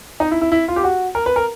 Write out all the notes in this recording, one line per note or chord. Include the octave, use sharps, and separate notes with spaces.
D#4
E4
E4
E4
F4
G4
F#4
A#4
B4
A#4